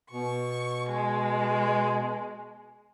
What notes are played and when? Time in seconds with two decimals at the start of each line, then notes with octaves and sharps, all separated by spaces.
0.11 B2 C#6
0.88 G#3